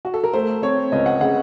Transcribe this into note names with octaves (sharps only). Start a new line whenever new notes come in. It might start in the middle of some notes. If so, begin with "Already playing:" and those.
F#4
A4
A#4
A3 C5
C4 C#5
C#2 D#5
F#5
C#3 F#5